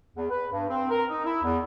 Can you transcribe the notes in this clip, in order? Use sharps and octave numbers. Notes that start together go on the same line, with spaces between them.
E2
B4
G2
C4
A#4
D#4
E4
E2